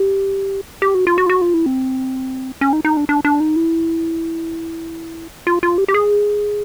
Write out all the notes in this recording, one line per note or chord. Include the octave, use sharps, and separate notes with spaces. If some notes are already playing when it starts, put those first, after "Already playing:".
Already playing: G4
G4
F#4
F4
F#4
F4
F#4
F4
E4
C4
C#4
D#4
D#4
D4
D4
D4
D#4
E4
F4
F4
G4
G4
G#4